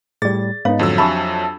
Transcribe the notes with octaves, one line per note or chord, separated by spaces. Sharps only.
A2 G3 G#4 D5 A6
G#2 B3 D#4 C#5 F5
F2 D3 F#3 E6
D4 G4 E5 A5 B5